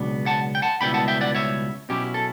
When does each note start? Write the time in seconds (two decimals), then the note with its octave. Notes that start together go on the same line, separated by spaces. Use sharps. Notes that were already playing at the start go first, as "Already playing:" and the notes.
Already playing: C#2 B2 F#3 B3 D4
0.26 F#5 A5
0.55 G5
0.62 F#5 A5
0.81 C#2 B2 G3 B3 E4 G5 B5
0.94 F#5 A5
1.08 E5 G5
1.21 D5 F#5
1.35 C#5 E5
1.89 B2 F#3 C#4 E4 G4
2.14 A4